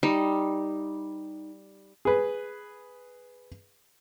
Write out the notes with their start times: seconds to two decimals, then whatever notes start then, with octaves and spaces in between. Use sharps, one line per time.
0.03 G3 D#4
2.05 G#4 B4